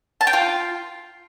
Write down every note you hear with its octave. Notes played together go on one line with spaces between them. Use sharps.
A5
G5
F4